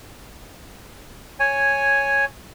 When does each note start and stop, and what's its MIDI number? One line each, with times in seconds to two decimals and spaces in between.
1.40 2.25 73
1.40 2.25 80